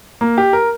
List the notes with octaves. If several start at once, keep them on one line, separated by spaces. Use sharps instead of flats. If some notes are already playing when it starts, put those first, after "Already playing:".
A#3
G4
A#4